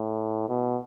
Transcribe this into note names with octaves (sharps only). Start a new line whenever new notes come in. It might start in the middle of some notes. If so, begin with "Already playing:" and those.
Already playing: A2
B2